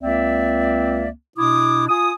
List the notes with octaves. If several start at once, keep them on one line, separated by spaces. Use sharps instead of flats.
C#2 A#3 C4 D5 E5
B2 D4 E4 D6 D#6
F4 G#5 D#6